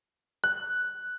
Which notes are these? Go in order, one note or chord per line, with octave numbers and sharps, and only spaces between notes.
F#6